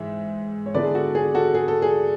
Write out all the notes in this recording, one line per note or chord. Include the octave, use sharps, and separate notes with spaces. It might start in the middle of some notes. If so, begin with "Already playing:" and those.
Already playing: G#2 E3 E5
C#5
D3 G#3 B3 E4 B4 D5
G#4
F#4 A4
G#4
F#4 A4
G#4
A4
G#4